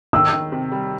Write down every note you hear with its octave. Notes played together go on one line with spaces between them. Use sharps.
D#3 E6
D#3
C3
G3